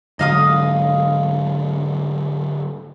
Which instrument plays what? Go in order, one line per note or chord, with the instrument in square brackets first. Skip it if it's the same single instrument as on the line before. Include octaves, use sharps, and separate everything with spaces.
[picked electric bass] G#2 D3 F#3 [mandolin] D#5 F5 D#6